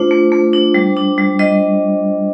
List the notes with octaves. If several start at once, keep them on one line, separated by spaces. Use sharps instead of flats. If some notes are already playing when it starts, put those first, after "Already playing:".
Already playing: A3 D4 F4 C5
A3
A3
D4
G3
D4
G3
G3 D#5